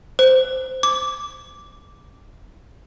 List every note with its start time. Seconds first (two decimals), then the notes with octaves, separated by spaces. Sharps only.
0.19 C5
0.83 D6